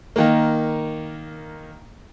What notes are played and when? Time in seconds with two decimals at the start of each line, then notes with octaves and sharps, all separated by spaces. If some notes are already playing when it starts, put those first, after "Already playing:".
0.16 D#3 A#3